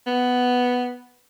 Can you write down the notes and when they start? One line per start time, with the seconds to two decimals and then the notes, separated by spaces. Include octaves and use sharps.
0.06 B3